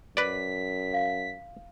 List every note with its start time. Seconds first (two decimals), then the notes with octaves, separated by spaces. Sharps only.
0.17 F#2 B4 D5 B6
0.93 F5